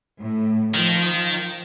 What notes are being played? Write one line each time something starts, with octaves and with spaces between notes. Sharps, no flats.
A2
D#3 F3